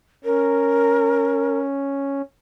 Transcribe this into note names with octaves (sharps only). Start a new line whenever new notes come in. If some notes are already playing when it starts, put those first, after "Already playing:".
C#4 A#4